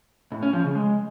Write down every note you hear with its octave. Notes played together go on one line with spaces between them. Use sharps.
A2
C#4
F3
C#3
G#3